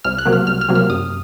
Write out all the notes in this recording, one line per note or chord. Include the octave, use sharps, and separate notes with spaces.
C2 F6
F#6
C3 F#3 A#3
F6
C2 F6
F6
C3 F#3 A#3
F6
F#2 D#6